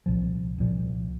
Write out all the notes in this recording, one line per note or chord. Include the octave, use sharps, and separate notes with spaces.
C2 A#2 F3
C2 A#2 F3